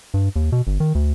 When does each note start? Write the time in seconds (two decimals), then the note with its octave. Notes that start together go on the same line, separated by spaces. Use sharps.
0.14 G2
0.36 D#2
0.52 B2
0.67 G1
0.80 D#3
0.95 D2